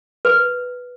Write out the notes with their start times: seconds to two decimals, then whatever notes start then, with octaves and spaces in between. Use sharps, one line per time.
0.25 B4